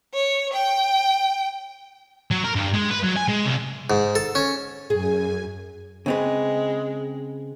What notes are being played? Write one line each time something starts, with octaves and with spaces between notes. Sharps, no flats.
C#5
G5
F#3
A#4
G2
G#3
B4
F#3
G#5
G#3
C2
G#2
A4
C#4
F#2 G#4 G#5
C#3 G#3 C4 B4